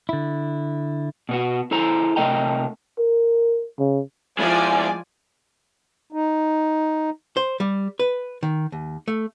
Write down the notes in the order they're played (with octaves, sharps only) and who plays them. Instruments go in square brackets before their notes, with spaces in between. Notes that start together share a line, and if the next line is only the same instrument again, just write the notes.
[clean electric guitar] D3 E4
[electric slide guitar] B2 B3 F#4
E4 A4 C5 A#5
C3 A3 A#4 D#5 G5 A#5
[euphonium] A#4
C#3
[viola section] F3 D5 [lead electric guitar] G#3 E4 [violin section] G#5
[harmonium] D#4
[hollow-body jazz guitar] C5
G3
B4
D#3
D#2
A3